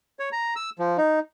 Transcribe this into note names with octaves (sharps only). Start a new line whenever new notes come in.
C#5
A#5
E6
F3
D#4